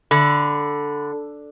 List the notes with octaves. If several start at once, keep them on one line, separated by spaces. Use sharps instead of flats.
D3 B5